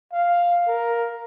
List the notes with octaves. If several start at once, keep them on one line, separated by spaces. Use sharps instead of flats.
F5
A#4